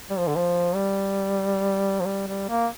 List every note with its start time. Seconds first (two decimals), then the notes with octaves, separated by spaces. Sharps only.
0.10 G3
0.19 F3
0.27 D3
0.36 F3
0.75 G3
2.00 F3
2.06 G3
2.27 G3
2.49 A#3